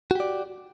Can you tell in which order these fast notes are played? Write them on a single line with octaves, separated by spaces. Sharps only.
F#4 G4 D5